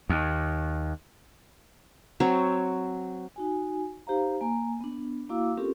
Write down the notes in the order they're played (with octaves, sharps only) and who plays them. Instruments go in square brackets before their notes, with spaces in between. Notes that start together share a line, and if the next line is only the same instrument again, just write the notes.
[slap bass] D#2
[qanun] F#3 C4 C#5
[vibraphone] D#4 F#4 G#5
D#4 G4 C5 F5 A#5
A#3 G#5 A#5
B3 D4
A#3 E4 F#4 F5 D6 E6
C4 C#4 F4 G4 A4 A#4